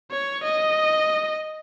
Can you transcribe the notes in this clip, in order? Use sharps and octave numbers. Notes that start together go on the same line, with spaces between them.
C#5
D#5